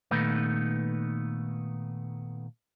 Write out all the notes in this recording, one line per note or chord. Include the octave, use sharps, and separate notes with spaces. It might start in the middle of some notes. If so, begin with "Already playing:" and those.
A#2 D#3 A3 B3 D#4 B4